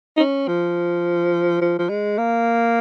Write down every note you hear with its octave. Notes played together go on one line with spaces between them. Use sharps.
D#4
C#4
F3
F3
F3
G#3
A#3